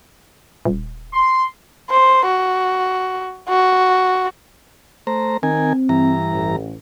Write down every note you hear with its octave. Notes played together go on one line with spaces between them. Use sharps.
D#1
C6
C5
F#4
F#4
A3 C5 A#5
D#3 C4 A#4 G#5
G2 E3 A#5
A1